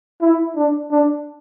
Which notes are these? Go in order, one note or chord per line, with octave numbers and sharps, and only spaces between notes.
E4
D4
D4